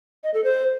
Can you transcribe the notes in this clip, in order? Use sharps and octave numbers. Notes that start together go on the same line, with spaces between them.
D#5
A4
C5